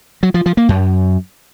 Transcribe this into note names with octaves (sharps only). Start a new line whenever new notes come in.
F#3
F3
F3
A#3
F#2